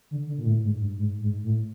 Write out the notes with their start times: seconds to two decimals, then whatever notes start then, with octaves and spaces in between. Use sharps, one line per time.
0.11 D3
0.27 D3
0.38 A#2
0.46 A2
0.63 G#2
0.80 G2
0.97 G#2
1.20 G#2
1.43 A2